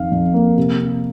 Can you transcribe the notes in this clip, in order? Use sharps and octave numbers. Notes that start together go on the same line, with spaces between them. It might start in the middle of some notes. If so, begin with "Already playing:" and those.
Already playing: F2 D#3 F5
F2
A#3
C3
C3